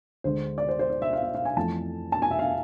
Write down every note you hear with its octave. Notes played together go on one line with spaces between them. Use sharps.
D2 D3 G#3 C5
D5
C5
C5
D5
E5
F5
E5
F5
G#5
F2 E3 A3 A5
A5
G#5
E5
F5